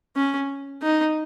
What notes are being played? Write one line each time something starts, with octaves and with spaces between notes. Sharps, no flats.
C#4
D#4